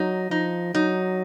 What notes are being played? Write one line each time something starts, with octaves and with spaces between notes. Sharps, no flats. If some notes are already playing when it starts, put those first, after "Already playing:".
Already playing: F#3 D#4
F3 D#4
F#3 D#4